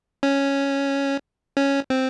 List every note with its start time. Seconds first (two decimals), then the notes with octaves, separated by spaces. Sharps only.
0.23 C#4
1.57 C#4
1.90 C4